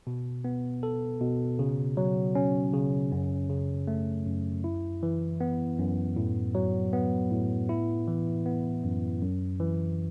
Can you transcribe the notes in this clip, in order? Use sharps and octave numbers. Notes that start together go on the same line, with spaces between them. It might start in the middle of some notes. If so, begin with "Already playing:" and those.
B2
B3
A4
B2
C#3
F#3
C#4
C#3
F#2
C#3
A3
F#2
E4
E3
B3
F#2
A2
F#3
B3
A2
E4
E3
B3
F#2
F#2
E3